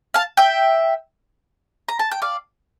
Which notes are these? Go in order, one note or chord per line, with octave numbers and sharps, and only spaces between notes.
F5 A5
E5 G5
A#5
A5
G5
D5 F5